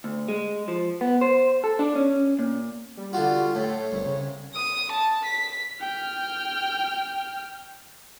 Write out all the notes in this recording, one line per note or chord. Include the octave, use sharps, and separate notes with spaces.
D2
G#3
F3
B3
C5
A4
D4
C#4
A#2
G3
D3 F4 F#4
A2 A3 C#5
G1 C2
C#3
D#6
A5
B6
G5 F6